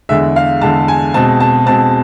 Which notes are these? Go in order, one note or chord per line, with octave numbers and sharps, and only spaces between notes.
E2 D3 G#3 E5
F5
E2 D3 G#3 A5
G#5
B2 G#3 C4 A5
A5
B2 G#3 C4 A5